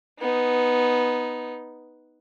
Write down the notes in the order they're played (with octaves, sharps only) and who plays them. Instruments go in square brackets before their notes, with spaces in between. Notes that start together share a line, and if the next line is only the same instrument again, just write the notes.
[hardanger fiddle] B3 D#4